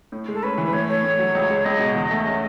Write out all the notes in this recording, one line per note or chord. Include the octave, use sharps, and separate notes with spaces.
A2
G#3
A4
C#4 B4
E3
B4
A2 C#5
A3 C#5
A2
F#3
C#2
G#3
C#2 D#5
B2
E2
A3
C#4